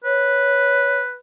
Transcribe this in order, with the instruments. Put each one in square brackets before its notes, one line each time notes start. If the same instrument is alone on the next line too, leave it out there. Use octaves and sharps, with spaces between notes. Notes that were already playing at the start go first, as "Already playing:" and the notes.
[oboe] B4 [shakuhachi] C#5